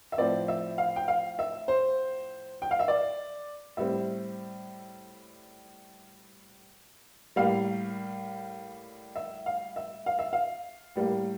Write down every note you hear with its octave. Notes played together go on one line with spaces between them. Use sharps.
E5
A2 F3 C4 D5
E5
F5
G5
F5
E5
C5
G5
F5
E5
D5
A2 G3 C4 E5
A2 G3 A#3 F5
E5
F5
E5
F5
E5
F5
A2 G3 A#3